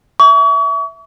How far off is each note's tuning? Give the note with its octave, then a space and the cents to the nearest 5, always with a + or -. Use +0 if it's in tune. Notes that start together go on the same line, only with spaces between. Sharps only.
E5 +0 C#6 +40